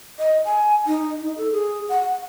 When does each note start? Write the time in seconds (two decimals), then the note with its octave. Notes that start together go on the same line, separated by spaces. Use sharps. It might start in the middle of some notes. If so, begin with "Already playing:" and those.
0.19 D#5
0.45 G#5
0.87 D#4
1.21 D#4
1.38 A4
1.52 G#4
1.89 F#5